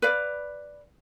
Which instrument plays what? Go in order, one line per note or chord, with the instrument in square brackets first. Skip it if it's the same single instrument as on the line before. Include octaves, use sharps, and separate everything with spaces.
[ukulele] B4 D5 F5